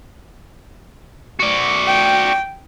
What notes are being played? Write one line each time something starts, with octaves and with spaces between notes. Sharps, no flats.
F#4 D5
G5